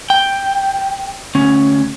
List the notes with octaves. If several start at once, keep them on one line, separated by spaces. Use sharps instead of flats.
G5
D2 C#4